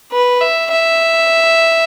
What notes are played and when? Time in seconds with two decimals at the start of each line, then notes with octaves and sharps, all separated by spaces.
0.12 B4
0.41 E5
0.72 E5